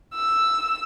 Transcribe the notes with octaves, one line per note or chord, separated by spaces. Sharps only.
E6